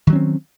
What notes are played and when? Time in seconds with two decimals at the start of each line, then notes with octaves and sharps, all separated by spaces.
0.07 D#3
0.10 F#3
0.13 C#4
0.16 C4